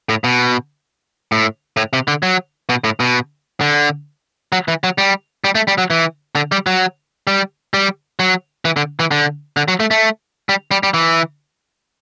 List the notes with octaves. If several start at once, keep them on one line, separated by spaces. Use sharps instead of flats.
A2
B2
A2
A2
C3
D3
F#3
B2
A2
B2
D3
F#3
E3
F#3
G3
G3
A3
G3
F#3
E3
D3
G3
F#3
G3
G3
F#3
E3
D3
E3
D3
D3
F#3
A3
A3
G3
G3
G3
E3